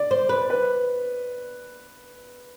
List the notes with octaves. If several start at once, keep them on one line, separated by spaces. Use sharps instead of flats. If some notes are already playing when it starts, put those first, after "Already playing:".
Already playing: D5
C5
B4
B4